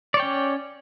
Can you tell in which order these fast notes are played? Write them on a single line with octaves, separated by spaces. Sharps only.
D5 C#5 G5 C#4